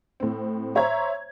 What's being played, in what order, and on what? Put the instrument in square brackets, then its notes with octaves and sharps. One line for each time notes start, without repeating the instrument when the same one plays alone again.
[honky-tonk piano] A2 C4
C5 C#5 E5 A#5 G#6